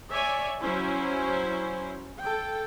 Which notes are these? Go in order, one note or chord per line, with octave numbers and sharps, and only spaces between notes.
C#5 D5 E5 G#5
F#3 C#4 E4 C5
A4 G5